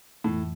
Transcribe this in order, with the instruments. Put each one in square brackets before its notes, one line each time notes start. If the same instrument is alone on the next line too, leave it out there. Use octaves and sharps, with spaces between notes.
[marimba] F2 E3 A3 [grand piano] A2